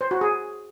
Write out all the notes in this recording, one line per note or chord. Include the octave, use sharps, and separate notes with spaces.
C5
F#4
G#4